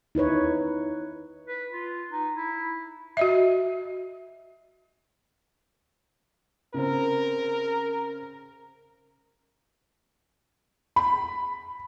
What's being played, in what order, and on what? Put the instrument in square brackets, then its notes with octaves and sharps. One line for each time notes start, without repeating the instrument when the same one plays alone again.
[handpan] D#4 E4 B4 C#5
[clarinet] B4
F4
D#4
E4
[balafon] F#4 D#5 E5
[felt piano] C#3 C4 [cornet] A#4
[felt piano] B5